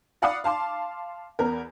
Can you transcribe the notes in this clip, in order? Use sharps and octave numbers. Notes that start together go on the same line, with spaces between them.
D5 F5 F#5 B5 D6 D#6
F5 A5 C6 D6
E2 B3 A#4